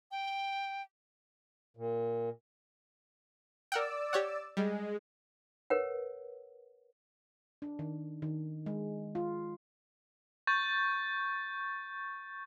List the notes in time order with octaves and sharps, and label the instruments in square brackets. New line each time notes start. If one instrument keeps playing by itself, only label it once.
[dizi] G5
[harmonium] A#2
[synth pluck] A#4 F#5 G5 [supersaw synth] D5 E6
[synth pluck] G4 C#5 F#5
[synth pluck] G3 [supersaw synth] G#3
[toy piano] A#4 B4 C#5 F#5
[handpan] D4
D#3
D#3
G#3
F4
[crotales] C#6 G6 A6